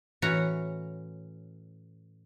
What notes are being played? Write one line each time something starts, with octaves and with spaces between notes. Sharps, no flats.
A2 E3 C#4 F#4 A#5